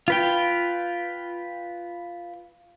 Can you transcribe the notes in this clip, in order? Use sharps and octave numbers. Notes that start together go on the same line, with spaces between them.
F4 B4 G5